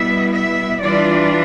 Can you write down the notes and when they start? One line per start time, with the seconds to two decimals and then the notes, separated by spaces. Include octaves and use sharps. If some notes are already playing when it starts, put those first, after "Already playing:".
Already playing: B2 G3 B3 E4 E5
0.32 E5
0.81 E3 G3 D4 F4 D5